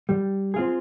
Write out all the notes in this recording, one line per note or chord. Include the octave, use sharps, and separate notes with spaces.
G3
C4 F4 G#4